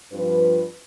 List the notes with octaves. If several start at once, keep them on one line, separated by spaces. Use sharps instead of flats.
G2 F3 C4 F4 B4